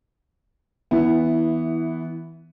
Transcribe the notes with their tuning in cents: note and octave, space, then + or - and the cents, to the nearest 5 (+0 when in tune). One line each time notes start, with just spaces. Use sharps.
E3 -15 B3 +0 E4 +0